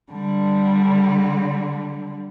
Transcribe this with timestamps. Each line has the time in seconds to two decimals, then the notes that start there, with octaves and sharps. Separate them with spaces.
0.12 D3 G3